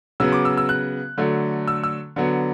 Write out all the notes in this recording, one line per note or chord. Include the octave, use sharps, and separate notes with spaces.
C#3 F#3 B3 E6
D6
E6
E6
F#6
D3 F#3 A3
E6
E6
D3 F#3 B3